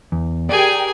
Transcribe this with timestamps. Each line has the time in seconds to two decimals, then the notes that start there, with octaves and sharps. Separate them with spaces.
0.12 E2
0.49 G4 G#4 A#4 D5 G5 G#5